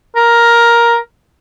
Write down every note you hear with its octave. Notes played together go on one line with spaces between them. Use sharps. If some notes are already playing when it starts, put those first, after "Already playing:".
A#4